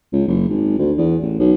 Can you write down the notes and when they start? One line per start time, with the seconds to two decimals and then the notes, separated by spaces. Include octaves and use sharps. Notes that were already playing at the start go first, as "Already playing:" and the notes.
0.13 C#2
0.28 F#1
0.49 G#1
0.78 D2
0.98 E2
1.22 A1
1.40 B1